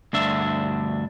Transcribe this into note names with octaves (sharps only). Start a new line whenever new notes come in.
D2 G2 D4 E5